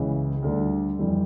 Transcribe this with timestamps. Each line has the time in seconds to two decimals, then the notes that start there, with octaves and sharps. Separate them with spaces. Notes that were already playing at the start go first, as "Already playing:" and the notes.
Already playing: C#2 C#3 E3
0.42 D2 D3 G3
0.99 F2 E3 G3